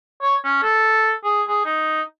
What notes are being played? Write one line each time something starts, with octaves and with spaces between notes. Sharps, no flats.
C#5
C#4
A4
G#4
G#4
D#4